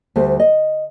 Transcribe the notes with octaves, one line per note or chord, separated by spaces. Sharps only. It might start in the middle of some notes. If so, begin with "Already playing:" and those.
D2 G3 A3 C5
D#5